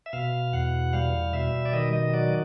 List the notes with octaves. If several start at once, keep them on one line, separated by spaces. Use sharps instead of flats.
E5
B2 F5
E2 F#5
G3 F5
B2 E5
D5
D#3 D#5
D#5
F#3 D5